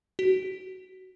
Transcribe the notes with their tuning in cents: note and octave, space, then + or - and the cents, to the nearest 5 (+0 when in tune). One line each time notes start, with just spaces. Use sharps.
F#4 +20